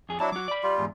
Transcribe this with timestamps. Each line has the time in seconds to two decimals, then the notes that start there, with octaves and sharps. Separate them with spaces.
0.09 F2 G#4
0.20 F#3 D4 E4 A5
0.32 F#3 F#4 D6
0.48 D5 B5
0.63 G3 F4
0.78 E2 G#2